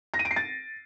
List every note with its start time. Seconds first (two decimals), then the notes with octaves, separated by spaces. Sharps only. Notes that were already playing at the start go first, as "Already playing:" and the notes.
0.14 A#6
0.19 D#7
0.25 D7
0.31 C7
0.36 A6